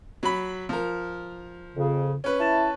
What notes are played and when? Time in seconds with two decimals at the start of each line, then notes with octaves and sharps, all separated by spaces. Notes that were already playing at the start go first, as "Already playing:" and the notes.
0.23 F#3 B5
0.69 F3 A#4
1.75 F2 C#3
2.24 C#4 B4
2.40 E4 A5